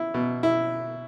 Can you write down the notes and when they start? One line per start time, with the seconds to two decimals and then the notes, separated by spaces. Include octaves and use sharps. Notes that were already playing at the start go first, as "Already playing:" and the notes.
Already playing: E4
0.14 B2
0.43 E4